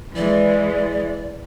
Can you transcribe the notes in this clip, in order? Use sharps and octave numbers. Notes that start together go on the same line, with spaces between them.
E3 G#3 D5